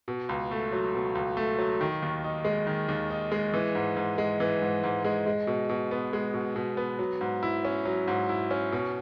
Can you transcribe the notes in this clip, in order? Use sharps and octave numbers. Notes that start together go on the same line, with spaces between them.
B2
C#2
A3
F#3
B2
C#2
A3
F#3
D#3
D#2
D#4
G#3
D#3
D#2
D#4
G#3
E3
G#2
G#2
G#3
E3
G#2
G#2
G#3
G#3
B2
B2
B3
G#3
B2
B2
B3
F#3
G#2
E4
C#4
F#3
G#2
E4
C#4
B2